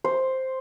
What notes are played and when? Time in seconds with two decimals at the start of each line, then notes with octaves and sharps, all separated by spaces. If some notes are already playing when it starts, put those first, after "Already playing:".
0.04 C5